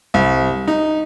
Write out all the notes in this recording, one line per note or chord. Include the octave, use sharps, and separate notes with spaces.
C2
D#4